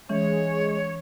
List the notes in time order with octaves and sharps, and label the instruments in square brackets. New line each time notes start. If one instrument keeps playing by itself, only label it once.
[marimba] E3 C#4 [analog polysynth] G#3 [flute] C#5